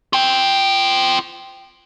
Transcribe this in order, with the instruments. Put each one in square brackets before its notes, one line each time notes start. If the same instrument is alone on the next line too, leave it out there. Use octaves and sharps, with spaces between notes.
[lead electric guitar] F4 G5